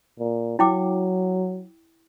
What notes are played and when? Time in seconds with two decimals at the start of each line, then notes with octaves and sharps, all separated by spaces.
0.19 A#2
0.59 F#3 E4 G5 D6